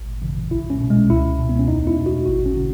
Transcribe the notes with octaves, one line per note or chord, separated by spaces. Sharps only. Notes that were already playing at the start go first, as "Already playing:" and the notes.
Already playing: G#1
F#2 C#3 E3
B1 E4
C#4
B2
G#3
C#2 E4
B2
B3
C#4
E2 D#4
E4
B2
F#4
G#1 F#4
C#4
C#3